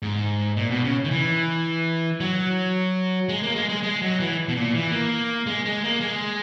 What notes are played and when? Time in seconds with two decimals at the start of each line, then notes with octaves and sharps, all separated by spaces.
0.02 G#2
0.57 A#2
0.70 B2
0.84 C#3
1.05 D#3
1.11 E3
2.20 F#3
3.29 G#3
3.43 A#3
3.56 G#3
3.69 G#3
3.83 G#3
4.02 F#3
4.20 E3
4.48 B2
4.55 A#2
4.74 E3
4.92 A#3
5.46 G#3
5.65 G#3
5.84 A#3
6.01 G#3